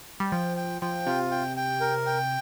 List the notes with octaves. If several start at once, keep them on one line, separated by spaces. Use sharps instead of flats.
G3
F3 G5
G5
F3 G5
C3 F4
G5
G5
A#4
G5